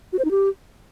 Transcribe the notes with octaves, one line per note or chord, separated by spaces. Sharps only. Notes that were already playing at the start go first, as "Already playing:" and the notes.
F#4
C5
D#4
G4